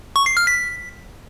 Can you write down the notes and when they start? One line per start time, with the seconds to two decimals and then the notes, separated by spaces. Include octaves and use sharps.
0.16 C#6
0.26 C7
0.37 F6
0.47 B6